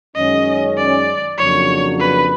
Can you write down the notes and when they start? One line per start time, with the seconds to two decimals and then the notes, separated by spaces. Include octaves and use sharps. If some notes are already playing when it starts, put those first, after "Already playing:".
0.15 F#2 D#3 G#3 C#4 D#5
0.77 D5
1.38 F2 C#3 F#3 A#3 D4 C#5
2.00 B4